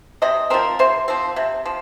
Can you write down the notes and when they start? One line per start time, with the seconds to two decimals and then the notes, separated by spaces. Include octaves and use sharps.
0.22 C3 D#5
0.50 F3 C4 A#4
0.79 C3 C5
1.08 F3 C4
1.36 C3
1.66 F3